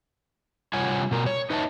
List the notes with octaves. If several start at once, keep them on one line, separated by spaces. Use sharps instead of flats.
C3 G3 F4 C#5 F#5 G#5
B2 A#4
C#5
D#4 B4 C#5 D#5 E5 A5